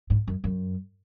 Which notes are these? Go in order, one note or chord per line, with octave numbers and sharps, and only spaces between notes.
G#2
F#2
F#2